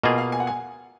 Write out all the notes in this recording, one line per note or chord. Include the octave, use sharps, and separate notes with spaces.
B2 A#3 F4 G#4 D#5
F5
G#5
F#5
G#5